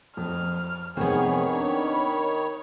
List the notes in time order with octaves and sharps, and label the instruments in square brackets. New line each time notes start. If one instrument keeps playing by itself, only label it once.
[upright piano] F2 [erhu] F6
[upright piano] F1 D#4 [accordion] D#3 C#5 [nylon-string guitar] B3 C4 [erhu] G#4
[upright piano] D4 [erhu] B5